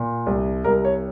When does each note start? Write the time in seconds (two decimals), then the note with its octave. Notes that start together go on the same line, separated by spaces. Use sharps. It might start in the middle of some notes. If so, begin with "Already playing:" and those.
Already playing: A#2
0.26 C2
0.64 C2 A#4
0.85 C#5